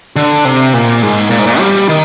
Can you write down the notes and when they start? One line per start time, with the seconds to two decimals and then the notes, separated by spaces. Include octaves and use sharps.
0.16 D3
0.45 C3
0.73 A#2
1.03 G#2
1.30 A#2
1.39 G#2
1.47 A#2
1.59 G3
1.89 D#3